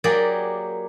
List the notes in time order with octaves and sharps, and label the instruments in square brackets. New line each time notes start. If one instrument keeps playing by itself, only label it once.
[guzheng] F#3 A#3 G4 G#4 D5